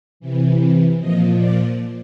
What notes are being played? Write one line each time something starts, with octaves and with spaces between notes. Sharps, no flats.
C3 E3
A#2 F3 D#5
D5